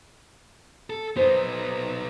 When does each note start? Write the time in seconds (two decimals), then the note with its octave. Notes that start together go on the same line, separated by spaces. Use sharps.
0.90 A4
1.16 B3 D#4 C5